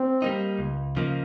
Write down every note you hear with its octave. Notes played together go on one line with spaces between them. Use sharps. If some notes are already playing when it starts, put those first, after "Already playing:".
Already playing: C4
G3 A#3 D#4
C#2
C#3 F3 A#3 D#4